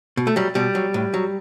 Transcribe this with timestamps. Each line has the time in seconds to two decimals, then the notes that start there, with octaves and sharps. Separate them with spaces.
0.17 B2
0.27 A3
0.36 F#3 G3
0.55 B2 G3
0.75 F#3
0.94 A2
1.14 F#3